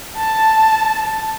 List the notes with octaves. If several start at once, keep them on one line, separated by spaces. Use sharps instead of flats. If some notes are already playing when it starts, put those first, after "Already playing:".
A5